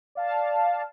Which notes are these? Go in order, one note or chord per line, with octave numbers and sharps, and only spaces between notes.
D5 F5 A5